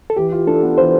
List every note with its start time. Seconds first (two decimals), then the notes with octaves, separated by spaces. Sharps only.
0.10 A4
0.17 E3 G4
0.32 F4
0.47 D4 A4
0.62 B3
0.78 E3 C5